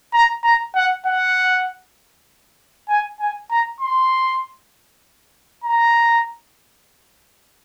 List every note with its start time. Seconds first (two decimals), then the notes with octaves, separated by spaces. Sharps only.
0.13 A#5
0.44 A#5
0.75 F#5
1.06 F#5
2.89 G#5
3.20 G#5
3.50 A#5
3.81 C6
5.64 A#5